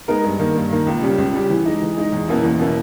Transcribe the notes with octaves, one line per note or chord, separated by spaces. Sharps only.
G#3 B3 D#4 A#4
G2
D#3 A#3
G2
D#3 A#3
C#2
C#3 G3 C#4 G4
C#2
C#3 G3 C#4 G4
E3
G#3 D#4
E3
G#3 D#4
E2
B2 A#3 C#4 E4
E2
B2 A#3 C#4 E4